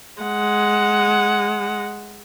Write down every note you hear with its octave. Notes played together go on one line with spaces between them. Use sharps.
G#3 F#5